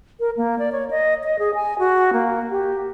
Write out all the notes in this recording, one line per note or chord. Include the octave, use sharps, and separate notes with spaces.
A#4
A#3
D5
C#5
D#5
D#5
G#4
G#5
F#4
A#3
G4